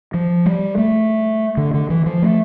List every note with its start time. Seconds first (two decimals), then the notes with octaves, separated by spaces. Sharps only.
0.14 F3
0.46 G3
0.78 A3
1.57 D3
1.74 D3
1.90 E3
2.06 F3
2.22 A3